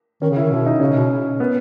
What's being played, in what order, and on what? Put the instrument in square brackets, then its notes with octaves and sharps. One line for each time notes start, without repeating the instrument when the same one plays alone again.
[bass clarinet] D#3 [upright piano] C#4
[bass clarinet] C#3
[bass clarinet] D#3 [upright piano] E4
[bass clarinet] B2 [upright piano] E4
[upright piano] D#4
[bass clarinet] C#3 [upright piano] C#4
[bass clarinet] B2
[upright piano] B3